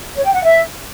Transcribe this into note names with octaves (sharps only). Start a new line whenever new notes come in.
C#5
G5
F#5
E5